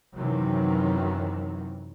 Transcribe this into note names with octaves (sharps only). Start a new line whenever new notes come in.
F#2 C3 D#3 E3 F#3